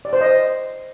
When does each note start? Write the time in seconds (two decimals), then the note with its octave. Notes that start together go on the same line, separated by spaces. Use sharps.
0.05 D5
0.13 C5
0.21 D#5